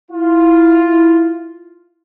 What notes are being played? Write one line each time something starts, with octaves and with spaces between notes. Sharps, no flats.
E4 F4